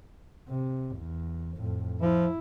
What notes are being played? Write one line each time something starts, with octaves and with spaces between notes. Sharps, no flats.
C3
E2
F2 A2
F3 E4